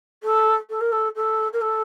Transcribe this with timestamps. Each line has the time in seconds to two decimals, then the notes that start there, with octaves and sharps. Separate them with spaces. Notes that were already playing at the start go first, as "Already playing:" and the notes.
0.23 A4
0.70 A4
0.81 A#4
0.92 A4
1.16 A4
1.53 A#4
1.61 A4